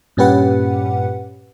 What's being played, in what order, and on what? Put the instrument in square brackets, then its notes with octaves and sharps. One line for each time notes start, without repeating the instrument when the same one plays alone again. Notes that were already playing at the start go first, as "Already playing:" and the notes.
[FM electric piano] G2 A#2 C#4 G4 B4 F#5